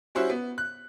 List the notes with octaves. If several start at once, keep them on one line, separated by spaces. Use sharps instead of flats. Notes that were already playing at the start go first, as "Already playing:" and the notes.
G3 C#4 E4 F#4 C5 E5
B3
F#6